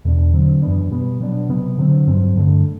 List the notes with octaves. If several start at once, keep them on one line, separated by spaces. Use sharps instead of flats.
E2 B2 A3 D4
D3 F#3 C4
F#2 E3 B3 D4
B2 G3 B3
B2 F#3 B3 D4
C3 F#3 B3
D3 F#3 C4
G2 F#3 C4
G2 D3 A3